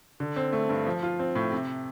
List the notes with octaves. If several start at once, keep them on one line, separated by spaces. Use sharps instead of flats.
D3
C4
A3
G2
F3
F4
C4
A2
C3